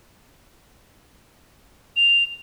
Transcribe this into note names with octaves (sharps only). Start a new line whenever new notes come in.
F7